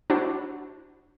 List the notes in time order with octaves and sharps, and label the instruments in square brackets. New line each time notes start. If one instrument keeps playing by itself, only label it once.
[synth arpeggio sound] D4 E4 F#4 C5